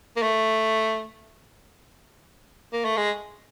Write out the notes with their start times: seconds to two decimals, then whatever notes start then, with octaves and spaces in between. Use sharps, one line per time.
0.17 A#3
0.23 A3
2.73 A#3
2.85 A3
2.97 G#3